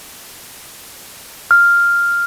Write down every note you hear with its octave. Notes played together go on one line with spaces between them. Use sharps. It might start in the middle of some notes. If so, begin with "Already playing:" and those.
F6